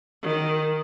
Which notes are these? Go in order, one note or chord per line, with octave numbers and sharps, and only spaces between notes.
D#3